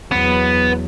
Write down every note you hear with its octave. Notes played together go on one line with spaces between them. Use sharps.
E2 F#3 B3